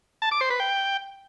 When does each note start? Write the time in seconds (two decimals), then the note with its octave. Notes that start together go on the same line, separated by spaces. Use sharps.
0.22 A5
0.31 D6
0.41 C5
0.50 B4
0.60 G5